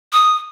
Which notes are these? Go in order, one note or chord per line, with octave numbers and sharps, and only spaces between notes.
D#6